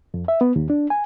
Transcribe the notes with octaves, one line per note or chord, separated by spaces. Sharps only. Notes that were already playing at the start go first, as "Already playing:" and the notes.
F2
E5
B3
D#2
D4
G#5